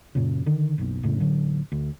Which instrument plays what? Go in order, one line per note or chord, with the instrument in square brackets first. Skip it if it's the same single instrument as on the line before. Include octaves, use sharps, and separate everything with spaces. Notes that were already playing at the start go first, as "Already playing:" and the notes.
[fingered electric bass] F#2 A#2 C#3
D3 D#3
F#1 B1
F1 A2 C#3
A1 D3 F#3
D2